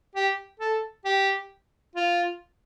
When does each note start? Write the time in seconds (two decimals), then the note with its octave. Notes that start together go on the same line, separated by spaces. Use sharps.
0.15 G4
0.60 A4
1.05 G4
1.95 F4